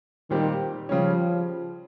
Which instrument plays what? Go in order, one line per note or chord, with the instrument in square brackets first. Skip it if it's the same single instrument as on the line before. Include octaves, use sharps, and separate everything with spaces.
[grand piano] A#2 G3 C4 G4 [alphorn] D#3
[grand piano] C#3 G3 C#4 [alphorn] F3